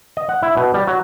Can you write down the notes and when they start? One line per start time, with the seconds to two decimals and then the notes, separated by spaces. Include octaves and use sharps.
0.17 D#5
0.29 F#5
0.43 E4
0.57 B2
0.74 G3
0.87 F#3